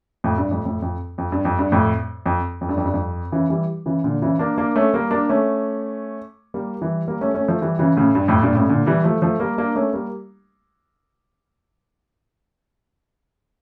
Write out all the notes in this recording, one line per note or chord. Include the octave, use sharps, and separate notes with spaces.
F2 A2
G2
F2 A2
F2 A2
F2
F2
G2
F2
G2
F2 A2
F2
F2
G2
F2
G2
F2
C#3 E3
E3 G3
C#3 E3
A#2 D3
C#3 E3
A#3 D4
A#3 D4
A3 C#4
G3 A#3
A#3 D4
A3 C#4
G3 A#3
E3 G3
G3 A#3
A3 C#4
A3 C#4
F3 A3
E3 G3
C#3 E3
A2 C#3
G2
F2 A2
G2 A#2
A2 C#3
A#2 D3
E3 G3
F3 A3
F3 A3
G3 A#3
A#3 D4
A3 C#4
G3 A#3